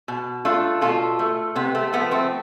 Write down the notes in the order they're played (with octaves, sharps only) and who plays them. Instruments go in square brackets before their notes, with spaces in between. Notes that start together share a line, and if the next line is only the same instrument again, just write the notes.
[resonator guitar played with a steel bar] B2
A3 D4 F4
B2 F4 A4
A3
C3 B3
A3
F3 A3 B3
A3 C4